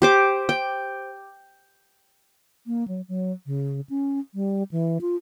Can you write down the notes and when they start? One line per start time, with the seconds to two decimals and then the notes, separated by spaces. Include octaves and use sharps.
0.02 G4 C5 D6
0.49 G5
2.67 A#3
2.88 F#3
3.08 F#3
3.46 C#3
3.90 C#4
4.34 G3
4.71 E3
5.01 F4